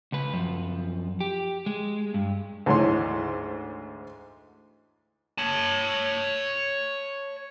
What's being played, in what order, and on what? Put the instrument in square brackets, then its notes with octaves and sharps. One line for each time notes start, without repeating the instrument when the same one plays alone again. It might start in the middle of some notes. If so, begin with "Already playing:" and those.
[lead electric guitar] C#2 B4
F#2 F3
G4
G#3
G2
[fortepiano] D2 G#2 E3 C#5 C6
[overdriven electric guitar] C#5 A5